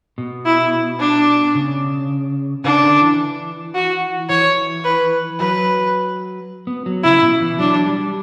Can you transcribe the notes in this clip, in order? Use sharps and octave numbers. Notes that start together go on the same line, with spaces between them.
B2
E4
D4
C#3
C#3 D4
D3
E3
F#4
E3 C#5
B4
F#3 B4
B3
F#3
C#3 E4
B2
E3
F#3 D4
G3